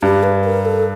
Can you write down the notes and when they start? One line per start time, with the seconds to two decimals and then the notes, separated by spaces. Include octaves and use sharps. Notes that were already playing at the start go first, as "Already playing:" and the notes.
0.02 G2 G4
0.23 B4
0.44 A#4
0.65 A4